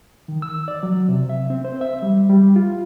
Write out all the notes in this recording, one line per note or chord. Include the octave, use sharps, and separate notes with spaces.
D#3
E6
D5
F#3
C3
E5
C4
C5
E5
G3
G3
F4